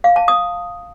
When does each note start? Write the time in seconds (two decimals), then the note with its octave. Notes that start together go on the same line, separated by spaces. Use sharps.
0.04 F5
0.16 A5
0.28 D#6